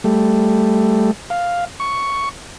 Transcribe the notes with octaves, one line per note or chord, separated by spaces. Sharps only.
G3 A3
F5
C#6